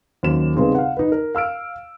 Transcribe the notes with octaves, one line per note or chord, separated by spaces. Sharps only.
D#2 F#3 C#4 C5 E7
C#3 G3 B3 C4 D#4 G#4
F5 F#5
D#4 B4
A#4
F5 E6 F6 D7